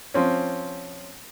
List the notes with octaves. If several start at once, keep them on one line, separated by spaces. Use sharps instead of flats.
F3 C4 C#4